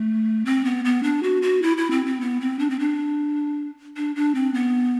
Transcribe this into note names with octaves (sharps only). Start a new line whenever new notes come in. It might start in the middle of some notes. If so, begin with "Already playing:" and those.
Already playing: A3
C4
B3
B3
D4
F#4
F#4
E4
E4
C4
C4
B3
C4
D4
C4
D4
D4
D4
C4
B3